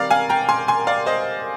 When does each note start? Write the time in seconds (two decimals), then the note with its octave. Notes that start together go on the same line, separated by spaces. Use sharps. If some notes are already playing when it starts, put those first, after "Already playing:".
Already playing: D#3 G3 C4 D5 F5 A#5
0.11 F5 G#5
0.29 G5 A#5
0.49 G#5 C6
0.68 G#5 C6
0.87 D5 F5
1.06 C5 D#5